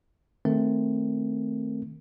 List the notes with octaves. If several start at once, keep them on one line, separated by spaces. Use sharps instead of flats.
D#3 A3 C4 A#4